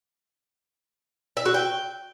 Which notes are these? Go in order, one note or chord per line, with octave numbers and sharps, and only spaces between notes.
E5
F#4
G5